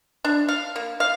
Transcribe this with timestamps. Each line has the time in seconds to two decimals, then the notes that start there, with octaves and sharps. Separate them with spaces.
0.25 D4
0.48 F5
0.76 A#3
1.00 F5